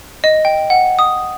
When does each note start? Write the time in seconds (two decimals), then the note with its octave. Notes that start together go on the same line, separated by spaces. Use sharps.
0.24 D#5
0.45 G5
0.70 F#5
0.99 D#6